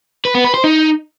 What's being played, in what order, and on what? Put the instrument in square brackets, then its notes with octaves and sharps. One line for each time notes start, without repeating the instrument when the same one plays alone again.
[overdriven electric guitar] B4
B3
B4
C5
D#4